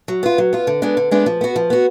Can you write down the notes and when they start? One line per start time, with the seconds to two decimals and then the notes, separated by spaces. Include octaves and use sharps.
0.08 F#3
0.23 B3 F4
0.38 F#3
0.53 B3 F4
0.67 D3
0.82 G#3 B3 D4
0.97 D3
1.11 G#3 B3 D4
1.26 F3
1.41 B3 F#4
1.56 F3
1.70 B3 F#4